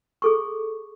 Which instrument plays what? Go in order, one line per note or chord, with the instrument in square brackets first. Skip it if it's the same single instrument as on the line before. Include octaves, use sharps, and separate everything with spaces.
[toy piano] G#4 A4 C#6